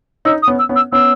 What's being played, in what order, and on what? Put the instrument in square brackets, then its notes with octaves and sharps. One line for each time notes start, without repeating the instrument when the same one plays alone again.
[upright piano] C#4 D#4 [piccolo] E6
[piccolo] D#6
[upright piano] B3 C#4
[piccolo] E6
[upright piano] B3 C#4
[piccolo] E6
[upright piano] B3 C#4 [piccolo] E6